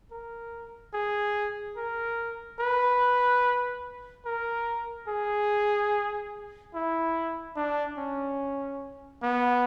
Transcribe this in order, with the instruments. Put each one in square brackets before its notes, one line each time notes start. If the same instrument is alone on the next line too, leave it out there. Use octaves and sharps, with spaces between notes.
[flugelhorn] A#4
G#4
A#4
B4
A#4
G#4
E4
D4
C#4
B3